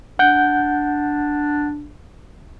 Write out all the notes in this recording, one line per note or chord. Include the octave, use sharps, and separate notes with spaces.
D4 F#5 G6